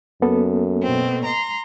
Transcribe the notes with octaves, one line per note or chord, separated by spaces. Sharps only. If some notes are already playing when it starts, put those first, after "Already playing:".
F#2 A#3 B3 A4
B2 C4
A#5 C6